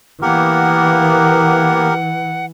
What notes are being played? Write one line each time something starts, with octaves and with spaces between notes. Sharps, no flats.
E3 A#3 B3 G4 A#4 F#5